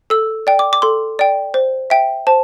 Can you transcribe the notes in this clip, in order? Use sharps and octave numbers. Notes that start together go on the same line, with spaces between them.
A4 E6
D5 G5
D6
D6
A4 C6
D5 G5
C5
E5 G5
C5 A5